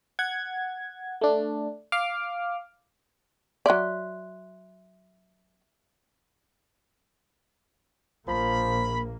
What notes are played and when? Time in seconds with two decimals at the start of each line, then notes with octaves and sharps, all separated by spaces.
0.19 F#5 G#6
1.21 A3 D4
1.92 F5 D6 F6
3.66 F#3 D5 E5 C6 F#6
8.28 A#1 F3 A#3 B5